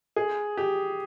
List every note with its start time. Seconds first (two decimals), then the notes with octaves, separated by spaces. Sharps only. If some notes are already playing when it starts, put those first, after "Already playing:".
0.16 G#4
0.57 G4